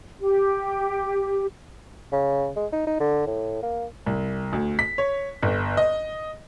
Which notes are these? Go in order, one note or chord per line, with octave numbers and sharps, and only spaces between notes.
G4
C#3
G#3
D#4
D#4
D3
A2
A#3
C2
D2
B6
C#5
G1
D#5